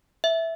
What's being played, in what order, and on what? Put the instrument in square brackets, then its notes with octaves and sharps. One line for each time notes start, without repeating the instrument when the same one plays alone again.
[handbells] E5